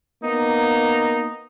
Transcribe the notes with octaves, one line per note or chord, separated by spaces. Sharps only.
A#3 B3 D#4